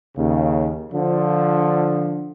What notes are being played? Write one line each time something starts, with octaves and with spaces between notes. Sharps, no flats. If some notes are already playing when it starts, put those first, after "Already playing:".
D#2 C#3
D3 F3